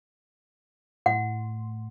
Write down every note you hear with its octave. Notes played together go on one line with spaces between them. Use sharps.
A2 F#5 C6